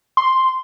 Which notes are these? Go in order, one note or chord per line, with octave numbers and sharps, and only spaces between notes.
C6